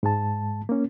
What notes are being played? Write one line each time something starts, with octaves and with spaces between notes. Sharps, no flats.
G#2 G#3 A5
A#3 C#4